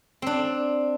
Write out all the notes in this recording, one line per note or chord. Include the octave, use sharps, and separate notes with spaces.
C4 D4